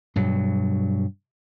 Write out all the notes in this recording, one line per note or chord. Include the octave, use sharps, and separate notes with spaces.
G2 B2 F#3